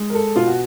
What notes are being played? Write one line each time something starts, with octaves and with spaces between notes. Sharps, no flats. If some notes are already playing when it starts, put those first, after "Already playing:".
Already playing: G#3
A#4
A4
B2 F4
F#4